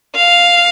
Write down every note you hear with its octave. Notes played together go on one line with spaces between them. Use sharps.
F5